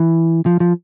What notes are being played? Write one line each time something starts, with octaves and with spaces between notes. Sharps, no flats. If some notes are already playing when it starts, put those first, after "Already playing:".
Already playing: E3
F3
F3